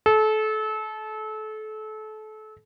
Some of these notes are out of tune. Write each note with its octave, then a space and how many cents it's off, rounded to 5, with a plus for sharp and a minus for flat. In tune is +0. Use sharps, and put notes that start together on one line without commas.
A4 -30